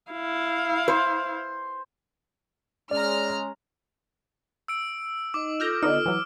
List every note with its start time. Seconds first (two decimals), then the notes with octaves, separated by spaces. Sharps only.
0.12 E4 F5
0.88 C5
2.91 G#3 C#4 D5 A#5 F6
4.68 E6 D7
5.34 D#4 D#5 D6
5.60 F4 A4 D#6 F6 G6 A#6
5.83 D3 B3 D#4 F6
6.06 E3 F#3